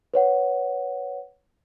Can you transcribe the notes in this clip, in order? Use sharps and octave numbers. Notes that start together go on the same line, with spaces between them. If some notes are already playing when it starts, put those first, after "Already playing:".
B4 C#5 F#5